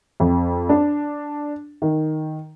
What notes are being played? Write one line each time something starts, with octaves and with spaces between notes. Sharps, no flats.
F2
D4
D#3